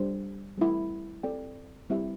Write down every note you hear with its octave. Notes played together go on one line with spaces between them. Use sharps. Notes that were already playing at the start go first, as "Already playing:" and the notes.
Already playing: G3 D4 C5
G3 C4 E4
C4 A4 D5 G5
G3 C4 E4 G4 E5